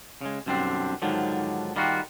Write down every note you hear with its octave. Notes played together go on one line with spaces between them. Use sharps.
C#3 G#3
B1 F#2 D3 G3 C4 D4
G#2 D3 D#3 F3 F#3
D#3 G3 A#3 F4 F#4